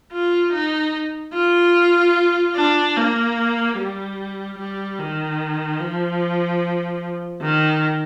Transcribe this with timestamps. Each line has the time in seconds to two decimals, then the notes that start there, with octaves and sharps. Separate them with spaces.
0.12 F4
0.52 D#4
1.33 F4
2.56 D4
2.97 A#3
3.77 G3
4.58 G3
4.99 D#3
5.79 F3
7.42 D#3